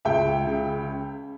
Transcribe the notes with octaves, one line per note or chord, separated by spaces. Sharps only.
C#2 E5 G5
C#3